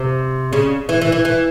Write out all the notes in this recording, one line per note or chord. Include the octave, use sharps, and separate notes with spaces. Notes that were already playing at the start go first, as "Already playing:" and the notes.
Already playing: C3
C#3
E3
E3
E3
E3